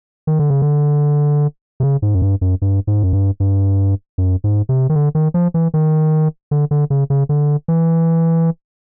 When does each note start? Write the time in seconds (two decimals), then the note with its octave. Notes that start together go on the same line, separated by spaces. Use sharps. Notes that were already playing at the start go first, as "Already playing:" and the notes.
0.27 D#3
0.39 D3
0.50 C#3
0.62 D3
1.80 C3
1.83 C#3
2.02 G#2
2.15 F#2
2.22 G2
2.41 F#2
2.62 G2
2.87 G#2
3.03 F#2
3.13 G2
3.40 G2
4.18 F#2
4.44 G#2
4.69 C3
4.89 D#3
4.95 D3
5.15 D#3
5.34 F3
5.54 E3
5.74 D#3
6.51 D3
6.71 D3
6.90 C#3
7.10 C#3
7.29 D3
7.68 E3